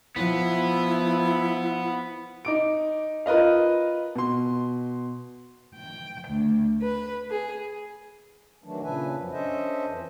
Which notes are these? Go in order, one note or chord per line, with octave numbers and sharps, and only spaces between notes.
F3 B3 E4
D#4 D6 D7
F4 A#4 B4 D#5 F5
B2 C6
G5
D2
B4
G#4
D#3 E3 F#3 A3 D4
A#2 C#3 D4 B4 E5 G#5
F2 F3 F#3
C#4 D4 A4 C5 D#5 E5
F2 E3